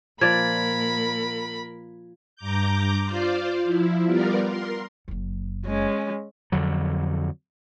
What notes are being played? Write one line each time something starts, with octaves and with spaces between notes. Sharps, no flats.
A#2 F3 A#4 D5 B5 G#6
G2 A#5 D6 G6
F4 C5 D5 F5
F3 E4
G3 B3 F4 A#4 D5
A#4 C6
F#1 F#2
G#3 C#4
F2 D3 F#3